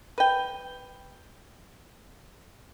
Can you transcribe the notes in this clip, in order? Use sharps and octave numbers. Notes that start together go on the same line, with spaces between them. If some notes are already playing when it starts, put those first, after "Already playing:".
B4 G5